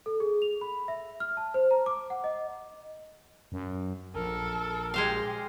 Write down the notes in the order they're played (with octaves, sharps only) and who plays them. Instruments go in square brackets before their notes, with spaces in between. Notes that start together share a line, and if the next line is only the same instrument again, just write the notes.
[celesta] A4
G#4
F7
B5
E5
F6
A5
C5
A#5
D6
F#5
D#5
[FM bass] F#2
[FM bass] A#1 [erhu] A4 [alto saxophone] A#4
[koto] G#3 C5 F5 [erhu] G4